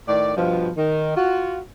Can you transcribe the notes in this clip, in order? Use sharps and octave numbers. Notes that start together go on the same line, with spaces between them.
A2 D#3 D5
G2 B2 F3
D#3
F4 F#4